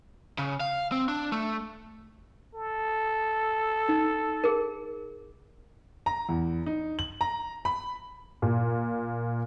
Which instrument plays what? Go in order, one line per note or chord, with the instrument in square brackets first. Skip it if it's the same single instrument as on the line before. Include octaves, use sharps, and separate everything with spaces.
[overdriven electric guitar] C#3
F5
C4
D4
A3
[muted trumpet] A4
[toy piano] D#4
G#4 A#4
[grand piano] A#5
E2
D#4
F#7
A#5
B5
[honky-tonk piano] A#2